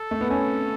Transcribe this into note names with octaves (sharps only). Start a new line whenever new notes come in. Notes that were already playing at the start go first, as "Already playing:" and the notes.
Already playing: A4
A3
B3
C#4 A4